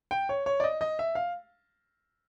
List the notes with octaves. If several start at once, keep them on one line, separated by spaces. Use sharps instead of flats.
G5
C#5
C#5
D5
D#5
D#5
E5
F5